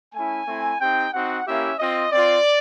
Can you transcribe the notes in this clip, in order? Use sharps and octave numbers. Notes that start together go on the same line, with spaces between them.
A3 C#4 E4 G#5
A3 C4 E4
C4 D#4 G4 G5
C4 D#4 F#4 F#5
A#3 C#4 E4 G4 E5
C4 F4 D#5
C4 F4 D5